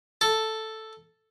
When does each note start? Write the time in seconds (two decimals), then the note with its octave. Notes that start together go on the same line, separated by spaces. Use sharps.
0.21 A4